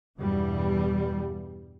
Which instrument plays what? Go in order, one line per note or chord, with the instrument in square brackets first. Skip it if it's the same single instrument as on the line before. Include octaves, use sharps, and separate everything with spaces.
[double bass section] E2 G2 B2 E3 G3